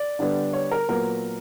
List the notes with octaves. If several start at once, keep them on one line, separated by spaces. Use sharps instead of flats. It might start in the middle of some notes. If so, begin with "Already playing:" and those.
Already playing: D5
D3 G3 B3 D4
C#5
A#4
A#2 F#3 B3 A#4